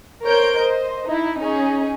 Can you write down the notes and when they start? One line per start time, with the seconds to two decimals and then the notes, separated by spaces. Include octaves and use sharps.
0.24 A#4 C5 C#5 G6 D7
0.59 C5 D#5
1.04 D#4 E4
1.39 C#4 D#4 G#4